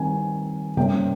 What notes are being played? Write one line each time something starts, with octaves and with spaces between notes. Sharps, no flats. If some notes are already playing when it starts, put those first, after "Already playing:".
Already playing: D#3 G3 C4 G#5
C3 G3 A#3 C#4 G5